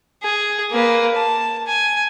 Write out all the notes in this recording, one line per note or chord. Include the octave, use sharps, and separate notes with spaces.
G#4
A#3 B4
A5
G#5